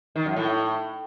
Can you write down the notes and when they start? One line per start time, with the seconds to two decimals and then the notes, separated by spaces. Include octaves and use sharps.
0.16 D#3
0.26 F#2
0.36 A2